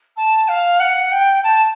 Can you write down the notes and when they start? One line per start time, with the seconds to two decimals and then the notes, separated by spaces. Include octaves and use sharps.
0.16 A5
0.48 F5
0.79 F#5
1.11 G5
1.43 A5